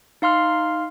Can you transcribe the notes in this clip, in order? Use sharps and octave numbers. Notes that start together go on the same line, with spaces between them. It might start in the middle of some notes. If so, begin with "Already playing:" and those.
D#4 F5 C6 F6